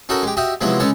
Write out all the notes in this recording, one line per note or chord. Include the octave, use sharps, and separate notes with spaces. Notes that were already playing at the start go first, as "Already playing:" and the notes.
C#4 D#4 F#4 A4 A#4
G#3 G4
F#4 G4 D#5 E5
C3 F3 F#3 G#3 B3 E4
C#3 G#3 C#4 A4 C#5